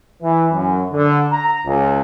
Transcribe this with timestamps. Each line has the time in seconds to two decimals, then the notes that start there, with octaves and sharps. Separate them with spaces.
0.22 E3
0.52 F#2
0.91 D3
1.30 A#5
1.65 C#2